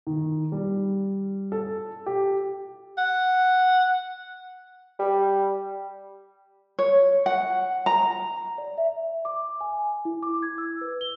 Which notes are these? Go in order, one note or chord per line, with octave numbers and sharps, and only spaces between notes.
D#3
G3
A4
G4
F#5
G3
C#5
F#5
A#5
D5
E5
D6
G#5
E4
D6
G#6
E6
B4
G7